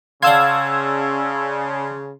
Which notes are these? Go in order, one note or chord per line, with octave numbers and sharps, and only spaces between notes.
C#3 D5 F5 F#5 A5 C6 E6 G#6